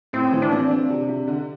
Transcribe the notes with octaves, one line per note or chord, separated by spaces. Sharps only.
A2 C4
E3
D4
C4
C4
C3
C3
D3